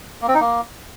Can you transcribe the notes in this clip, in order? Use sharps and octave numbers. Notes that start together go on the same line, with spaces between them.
A#3
C4
D#4
A#3